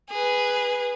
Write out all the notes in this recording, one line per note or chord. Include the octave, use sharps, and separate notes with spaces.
G#4 B4